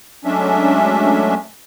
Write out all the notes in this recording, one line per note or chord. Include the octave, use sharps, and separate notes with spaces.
F#3 G#3 A3 C#4 D4 E5